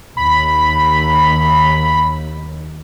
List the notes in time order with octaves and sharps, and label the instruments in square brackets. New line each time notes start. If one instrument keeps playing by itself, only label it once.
[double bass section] D#2 [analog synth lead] B5